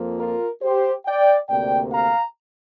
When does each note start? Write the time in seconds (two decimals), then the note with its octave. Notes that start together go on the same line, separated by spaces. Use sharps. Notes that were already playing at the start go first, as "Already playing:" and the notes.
Already playing: F2 F3 A#3
0.19 F4 A#4
0.62 G4 C5
1.06 D5 G5
1.49 D2 C3 A#3 D5 G5
1.92 F5 A#5